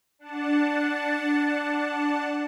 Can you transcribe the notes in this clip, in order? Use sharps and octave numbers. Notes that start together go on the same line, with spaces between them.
D4 F#5 A5